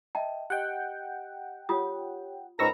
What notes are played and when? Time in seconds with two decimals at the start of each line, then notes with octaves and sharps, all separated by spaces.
0.15 D#5 E5 G5 A5
0.50 G4 D#5 F#5 G5
1.69 F4 G4 C#5 D#6
2.59 C#2 G#2 A#4 A#5 B5 C#6 E6 A#6